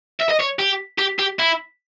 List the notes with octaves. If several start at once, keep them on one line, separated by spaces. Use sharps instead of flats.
E5
D#5
C#5
G4
G4
G4
E4